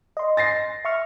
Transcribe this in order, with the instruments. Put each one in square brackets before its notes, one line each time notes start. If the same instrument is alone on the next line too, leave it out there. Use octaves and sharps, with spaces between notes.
[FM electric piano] D#5 C6
[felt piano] A6 A#6 C7
[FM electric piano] E5 C#6 F6